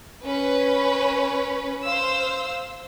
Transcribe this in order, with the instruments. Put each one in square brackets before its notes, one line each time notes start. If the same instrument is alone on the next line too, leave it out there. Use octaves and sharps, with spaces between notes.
[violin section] C#4 B4
C5 F5 E6